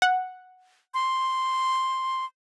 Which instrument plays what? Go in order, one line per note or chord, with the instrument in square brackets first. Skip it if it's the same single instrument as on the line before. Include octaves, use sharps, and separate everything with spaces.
[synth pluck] F#5
[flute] C6